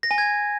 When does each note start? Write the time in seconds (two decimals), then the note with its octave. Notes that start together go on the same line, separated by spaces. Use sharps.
0.03 A#6
0.11 G#5
0.18 G#6